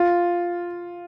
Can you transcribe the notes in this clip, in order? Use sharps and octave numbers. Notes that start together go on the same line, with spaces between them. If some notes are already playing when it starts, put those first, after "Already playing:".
Already playing: F4